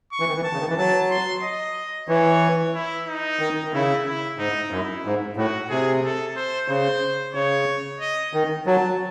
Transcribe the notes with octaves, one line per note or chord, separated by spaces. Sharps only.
C#6
E3
D#3
E3
A5
C#3
D#3
E3
F#3 A5
C6
D#5
E3 C#5
E4
D#4
D#3
D#3
C#3 E4
E4
G#2 D#4
F#2 E4
G#2
A2 F#4
C3 G#4
A4
C5
C#3 C5
C#3 C#5
D#5
D#3
F#3 A5